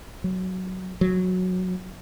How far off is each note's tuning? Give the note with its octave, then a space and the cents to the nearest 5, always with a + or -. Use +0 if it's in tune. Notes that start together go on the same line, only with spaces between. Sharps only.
F#3 +5
F#3 -10